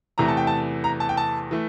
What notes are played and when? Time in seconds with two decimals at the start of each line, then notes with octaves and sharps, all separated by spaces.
0.18 E2 C3 E3 A3 A#5
0.28 A5
0.37 G5
0.47 A5
0.84 A#5
1.00 A5
1.09 G5
1.17 A5
1.51 E3 A3